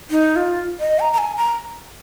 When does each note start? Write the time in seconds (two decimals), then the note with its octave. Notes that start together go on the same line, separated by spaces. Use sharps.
0.11 D#4
0.36 F4
0.80 D#5
1.00 A#5
1.13 A#5
1.18 G#5
1.37 A#5